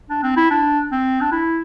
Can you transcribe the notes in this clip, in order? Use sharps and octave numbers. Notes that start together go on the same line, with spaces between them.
D4
C4
E4
D4
C4
D4
E4